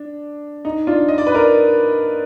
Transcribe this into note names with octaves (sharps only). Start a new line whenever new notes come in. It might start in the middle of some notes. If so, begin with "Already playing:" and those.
Already playing: D4
D#4
D4 F4
D#5
D5
B4
A#4 D5